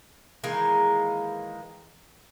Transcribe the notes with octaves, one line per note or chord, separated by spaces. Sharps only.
D#3 E3 G#3 A#3